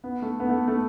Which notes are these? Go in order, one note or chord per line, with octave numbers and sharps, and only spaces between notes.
B3
A3
B3
A3
A3